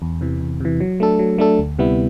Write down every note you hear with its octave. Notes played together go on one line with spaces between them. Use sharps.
E2
C3 E3
E2
C3 E3
F#3
A3 D4 A4
F#3
A3 D4 A4
D2
C3 G3 B3 E4